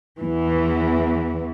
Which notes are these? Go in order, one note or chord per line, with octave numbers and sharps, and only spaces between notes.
E2 E3